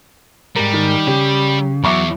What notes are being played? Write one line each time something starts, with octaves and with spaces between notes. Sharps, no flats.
G#2 G3 A#4
D#3
C#3 G4
E2 F#3 E5 C#6 D6